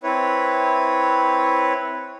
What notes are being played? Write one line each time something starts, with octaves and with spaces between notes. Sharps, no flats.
C4 E4 B4 C#5